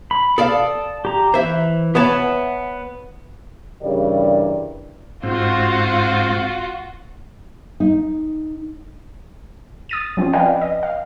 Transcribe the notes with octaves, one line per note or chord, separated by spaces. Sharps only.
B5
A4 D5 F5 A5 D#6
G4 A#5
E3 C5 E5
B3 C#5 E5 F#5 A5
G2 C#3 E3 G4 A#4 D5
G#2 C4 F4 F#4
D#4
D#6 A6 D#7
F3 C4 C#4 F4
B4 D5 D#5 F5 G5 G#5
D#5
F5